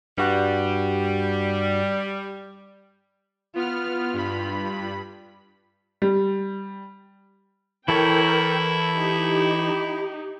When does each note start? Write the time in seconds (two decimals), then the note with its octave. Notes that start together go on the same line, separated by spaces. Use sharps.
0.18 G2 G3 F#4 F#6
3.55 B3 F4 F6
4.14 G2 B5
6.02 G3
7.88 E3 E4 A4 A#4 C#5 G5
8.95 D#4 G4